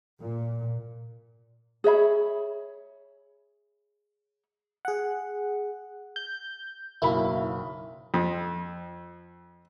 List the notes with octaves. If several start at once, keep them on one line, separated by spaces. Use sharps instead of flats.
A#2
G#4 C#5 E5 B5
G#4 F#5
G6
F#1 B1 A#3 E4 B5
F2